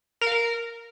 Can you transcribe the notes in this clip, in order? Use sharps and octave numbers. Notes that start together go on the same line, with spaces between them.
A#4
F5
A#4